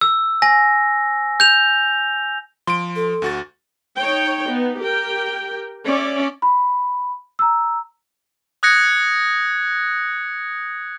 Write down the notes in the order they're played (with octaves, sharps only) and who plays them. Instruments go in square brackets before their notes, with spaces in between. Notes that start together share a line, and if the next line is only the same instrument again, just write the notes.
[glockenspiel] E6
G#5 A#6
G6 F7
[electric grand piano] F3 D7 [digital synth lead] C6
[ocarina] A4
[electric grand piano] D2 F#4 A6
[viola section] D#4 C#5 G5
B3 D#4
G4 A#4 G5
C#4 D5 E5
[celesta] B5
A#5 E6
[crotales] D#6 F#6 G#6 A#6 C#7